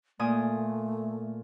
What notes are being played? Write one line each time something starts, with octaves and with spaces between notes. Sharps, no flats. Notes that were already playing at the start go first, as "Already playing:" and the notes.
A#2 A3 G#5 D#6